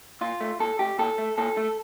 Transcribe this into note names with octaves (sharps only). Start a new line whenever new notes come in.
A#2 F4
A3
A#2 A4
A3 G4
A#2 A4
A3
A#2 A4
A3